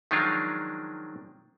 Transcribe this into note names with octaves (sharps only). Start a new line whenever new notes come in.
D#3 F3 F#3 G#3 D4 F4